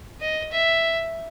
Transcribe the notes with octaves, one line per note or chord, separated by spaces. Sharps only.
D#5
E5